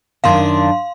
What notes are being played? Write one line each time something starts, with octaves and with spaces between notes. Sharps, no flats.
F#2 D#3 D4 F5 C6